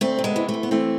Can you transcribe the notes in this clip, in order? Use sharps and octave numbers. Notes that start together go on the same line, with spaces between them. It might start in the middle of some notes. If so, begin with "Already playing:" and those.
D2 A3 C4
C3
G#3 B3
E3
A3
D2
B3
E3 A3 C4